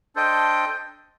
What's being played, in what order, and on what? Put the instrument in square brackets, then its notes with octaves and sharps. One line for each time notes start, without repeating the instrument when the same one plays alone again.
[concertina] D4 A4 C5 D#5 G5